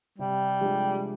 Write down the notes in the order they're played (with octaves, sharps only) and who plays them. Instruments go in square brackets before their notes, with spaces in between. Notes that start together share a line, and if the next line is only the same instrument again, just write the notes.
[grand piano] C3 [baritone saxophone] G3
[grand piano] F3 G#3 D4 G4